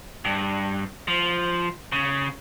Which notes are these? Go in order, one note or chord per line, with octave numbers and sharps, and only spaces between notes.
G2
F3
C#3